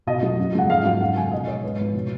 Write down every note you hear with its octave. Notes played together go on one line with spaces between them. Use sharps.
B2 D#5
F#3
F#2
C#3 F3 G#3 F#5
G#2 F5
F#3 F5
F#2 F#5
C#3 F3 G#3 G#5
B2 D#5
G#3 C#5
G#2 B4
F3 G#3
B2